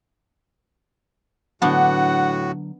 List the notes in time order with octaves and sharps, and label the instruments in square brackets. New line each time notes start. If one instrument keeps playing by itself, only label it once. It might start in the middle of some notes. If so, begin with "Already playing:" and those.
[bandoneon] A2 F#4 [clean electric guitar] D3 F#3 [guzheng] B3 D4 G5 [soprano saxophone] F#5